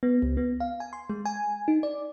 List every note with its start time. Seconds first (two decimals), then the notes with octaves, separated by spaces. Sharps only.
0.03 B3
0.22 C#2
0.37 B3
0.60 F5
0.80 G#5
0.93 C6
1.10 G#3
1.25 G#5
1.68 D#4
1.83 D5